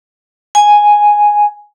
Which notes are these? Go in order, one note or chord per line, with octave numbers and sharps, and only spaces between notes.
G#5